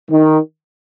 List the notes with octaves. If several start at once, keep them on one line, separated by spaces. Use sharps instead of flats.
D#3